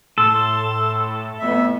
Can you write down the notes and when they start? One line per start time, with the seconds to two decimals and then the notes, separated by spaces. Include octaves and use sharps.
0.18 A2 A4 C6
1.39 F2 A2 A3 B3 E5